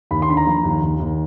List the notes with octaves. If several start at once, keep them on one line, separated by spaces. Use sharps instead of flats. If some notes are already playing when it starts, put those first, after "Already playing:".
D#2 B5
C6
D3 B5
A#5
F3
D#2
D#2
D#2